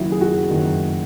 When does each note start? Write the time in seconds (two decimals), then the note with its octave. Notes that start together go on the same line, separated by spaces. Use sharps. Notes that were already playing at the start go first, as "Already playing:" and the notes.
Already playing: F#1 F#2 D#3 E4 F#4
0.12 G#4
0.21 F#4
0.49 F#1 F#2 D#3